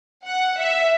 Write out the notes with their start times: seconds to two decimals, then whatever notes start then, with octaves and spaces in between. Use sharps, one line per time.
0.25 F#5
0.59 E5